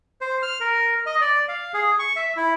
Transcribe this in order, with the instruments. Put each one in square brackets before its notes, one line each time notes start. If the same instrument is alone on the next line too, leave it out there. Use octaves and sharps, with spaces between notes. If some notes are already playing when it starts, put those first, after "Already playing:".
[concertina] C5
F6
A#4
D#5
D5
F5
G#4
C#6
E5
E4